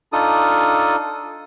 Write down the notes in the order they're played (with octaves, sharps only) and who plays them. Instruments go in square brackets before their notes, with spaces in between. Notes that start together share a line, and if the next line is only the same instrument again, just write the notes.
[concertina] D4 D#4 F4 A4 D#6